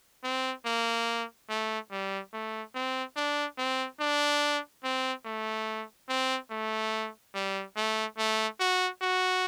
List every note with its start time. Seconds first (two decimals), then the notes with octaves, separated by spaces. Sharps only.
0.24 C4
0.66 A#3
1.49 A3
1.91 G3
2.33 A3
2.75 C4
3.17 D4
3.58 C4
4.00 D4
4.84 C4
5.25 A3
6.09 C4
6.51 A3
7.35 G3
7.76 A3
8.18 A3
8.60 F#4
9.02 F#4